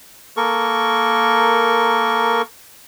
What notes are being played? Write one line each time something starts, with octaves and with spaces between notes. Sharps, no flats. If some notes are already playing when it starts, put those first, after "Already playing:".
A#3 A4 A#4 C#6